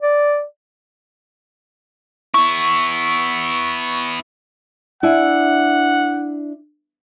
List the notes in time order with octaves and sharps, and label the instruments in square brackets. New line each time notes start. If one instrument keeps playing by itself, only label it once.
[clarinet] D5
[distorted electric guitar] B3 E4 [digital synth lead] C#6
[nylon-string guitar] D4 E4 G#5 [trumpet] F#5